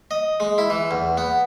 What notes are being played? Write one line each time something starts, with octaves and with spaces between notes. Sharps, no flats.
D#5
G#3
E4
E3
E2
B3